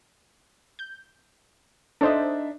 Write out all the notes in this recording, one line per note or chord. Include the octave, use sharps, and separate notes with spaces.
G6
D4 D#4 A4 C5 D#5 E5